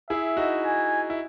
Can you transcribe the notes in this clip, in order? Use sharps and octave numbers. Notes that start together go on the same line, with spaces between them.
E4 G#4 E5
D#4 F#4
G#5
E4